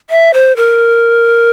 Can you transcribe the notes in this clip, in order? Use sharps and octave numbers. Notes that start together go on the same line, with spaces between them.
E5
C5
A#4